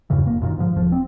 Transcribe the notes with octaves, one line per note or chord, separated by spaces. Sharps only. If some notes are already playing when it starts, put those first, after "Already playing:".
E2 G2 C#3 E3
F1 A#2 A#3
F#2 A#2 D#3
G#2 D3 F3
E1 F3
C4